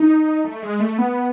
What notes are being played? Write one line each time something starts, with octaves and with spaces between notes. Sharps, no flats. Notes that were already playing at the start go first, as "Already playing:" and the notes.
Already playing: D#4
A3
G#3
A3
B3